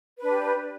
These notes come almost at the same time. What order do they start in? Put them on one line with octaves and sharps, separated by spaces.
B4 D4 G4